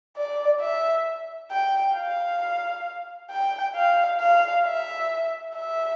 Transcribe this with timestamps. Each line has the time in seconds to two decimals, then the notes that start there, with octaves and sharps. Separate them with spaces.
0.16 D5
0.61 E5
1.51 G5
1.96 F5
3.30 G5
3.75 F5
4.20 F5
4.64 E5
5.55 E5